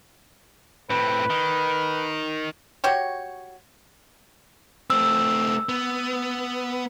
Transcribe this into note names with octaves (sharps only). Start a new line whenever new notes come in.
A2 C4 B4
D#3
F#4 G4 C#5
A3 C4 E6
B3